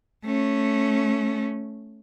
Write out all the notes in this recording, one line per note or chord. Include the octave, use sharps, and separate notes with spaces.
A3 C#4